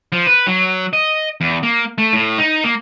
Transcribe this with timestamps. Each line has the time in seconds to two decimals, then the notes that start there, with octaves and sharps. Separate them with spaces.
0.12 F3
0.27 B4
0.47 F#3
0.93 D#5
1.41 E2
1.63 A#3
1.98 A3
2.13 A2
2.38 D#4
2.64 A#3